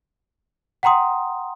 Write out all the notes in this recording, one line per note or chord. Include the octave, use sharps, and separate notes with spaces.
F#5 G5 A#5 C6 D#6